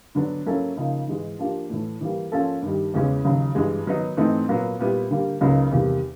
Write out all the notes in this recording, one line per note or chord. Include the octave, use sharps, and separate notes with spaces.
D3 F#3 B3 D4
F#3 A#3 C#4 E4 A4
C#3 F3 A#3 D#4
G#2 E3 G#3
F3 A#3 D4 G4
A2 E3 A3
E3 G3 A#3
F3 A#3 C#4 F4 A4
G2 D#3 G3
E2 C#3 E3 G#3 C#4
D#2 C#3 F#3
G2 E3 G#3
D#3 F#3 B3 D#4
G#2 E3 A3 C4 D#4
A#2 F#3 B3
A#2 G3 B3 E4
D3 G3 A#3
C#2 C#3 F#3 A#3 D#4
E2 C3 D#3 G3 A#3